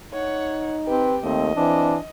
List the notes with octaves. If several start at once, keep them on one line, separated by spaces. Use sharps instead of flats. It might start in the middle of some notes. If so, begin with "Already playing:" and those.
D#4 C#5 F#5
C4 G4 B4
D#2 A3 C4 D#5
E3 C4 D4